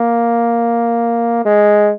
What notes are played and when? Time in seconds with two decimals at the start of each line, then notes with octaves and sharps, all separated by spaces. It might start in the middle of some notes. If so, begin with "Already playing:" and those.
Already playing: A#3
1.45 G#3